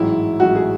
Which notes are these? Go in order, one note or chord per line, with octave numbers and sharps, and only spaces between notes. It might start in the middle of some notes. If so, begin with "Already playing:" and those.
Already playing: A1 G#2 F#3 E4
A1 G#2 F#3 F#4
G#4